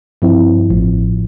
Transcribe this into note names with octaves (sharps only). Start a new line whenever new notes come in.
G2 F3 C4 E4
A1 A2 F3